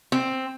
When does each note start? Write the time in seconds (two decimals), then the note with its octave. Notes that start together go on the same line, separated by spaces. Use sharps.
0.12 C4